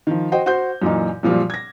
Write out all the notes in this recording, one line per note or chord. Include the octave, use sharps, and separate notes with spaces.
D#3 F3
F#4 C5 D#5 G5
F#4 C5 G6
F#2 A#2 E3 D#4
F#2 A#2 F3 G3
G#6 A#6